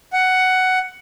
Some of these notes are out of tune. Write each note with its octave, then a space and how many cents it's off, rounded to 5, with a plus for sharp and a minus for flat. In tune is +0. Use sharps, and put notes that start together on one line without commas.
F#5 +10